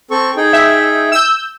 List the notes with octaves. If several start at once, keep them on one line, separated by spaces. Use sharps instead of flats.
C4 A4 C#6
D#4 G#4 G5
E5
E6 G6